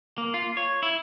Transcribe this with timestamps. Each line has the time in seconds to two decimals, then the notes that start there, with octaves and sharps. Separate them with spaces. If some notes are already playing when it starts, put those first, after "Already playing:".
0.18 A#3
0.34 F4
0.57 C#5
0.83 E4